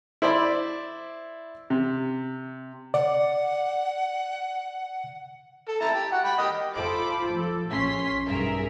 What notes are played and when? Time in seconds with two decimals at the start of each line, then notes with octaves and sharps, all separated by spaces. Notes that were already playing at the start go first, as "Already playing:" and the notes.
0.22 E4 C5 D5 B5
1.70 C3
2.94 D5 F#5
5.68 A4
5.80 E4 A5 A#5
5.94 G4
6.12 F#4 F#5
6.25 G5 B5
6.38 G4 D#5
6.73 F4 A4 C5 B5 D6
7.32 F3 A4
7.69 A#1 C#4 C6 B6
8.27 B1 G2 G#4 A#4 E5